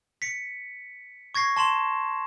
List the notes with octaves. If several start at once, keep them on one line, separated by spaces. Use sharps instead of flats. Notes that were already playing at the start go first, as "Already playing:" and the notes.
B6 C#7
C#6 G#6 A#6 C7
A5 C6 E7 F#7